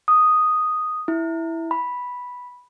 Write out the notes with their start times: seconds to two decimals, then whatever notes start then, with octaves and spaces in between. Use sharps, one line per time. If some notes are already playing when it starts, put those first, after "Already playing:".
0.08 D#6
1.08 E4
1.71 B5